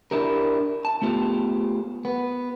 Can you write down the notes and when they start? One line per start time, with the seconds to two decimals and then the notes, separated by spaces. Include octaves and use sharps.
0.11 D4 E4 G4 A#4
0.85 A5
1.02 A3 B3 F4 G4
2.05 B3